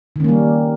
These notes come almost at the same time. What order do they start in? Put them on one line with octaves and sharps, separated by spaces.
D#3 C#4 A#3 G3